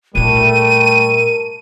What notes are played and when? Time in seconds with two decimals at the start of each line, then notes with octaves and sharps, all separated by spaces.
0.15 A#2 G3 A3 D#4 A#4 D#7